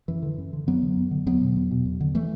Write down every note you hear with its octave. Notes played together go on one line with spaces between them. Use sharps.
F#2 E3
D3
F#2
D3
F#2 F#3 B3
D3
F#2
D3
E2 F#3 B3
B2
E2
B2
E2
D3
E3 A3